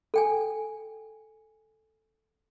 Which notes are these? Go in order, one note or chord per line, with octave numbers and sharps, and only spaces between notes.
A4 G5 G#5